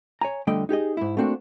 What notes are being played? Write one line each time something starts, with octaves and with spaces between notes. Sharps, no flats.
C#5 G#5 A#5
F2 D3 G3 A3 D#5 G5
D#4 G4 G#4 D#5
G#2 E4
A3 A#3 C4 D4 F#4